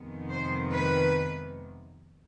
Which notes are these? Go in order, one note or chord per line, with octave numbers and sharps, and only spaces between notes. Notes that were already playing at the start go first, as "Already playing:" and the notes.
Already playing: F2 C3 D#3 G#3 B3
C5
B4